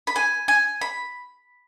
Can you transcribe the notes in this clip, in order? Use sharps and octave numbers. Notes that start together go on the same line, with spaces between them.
B5
G#5
G#5
B5